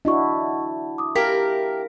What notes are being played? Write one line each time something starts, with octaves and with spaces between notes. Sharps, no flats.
D4 E4 F#4 D#5 C#6
D6 D#6
E4 G4 A#4 F5 B6